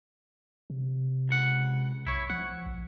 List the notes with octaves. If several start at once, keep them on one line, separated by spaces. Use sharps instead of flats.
C3
C#2 F#5
B1 E4 C#5
F3 F#5
A#1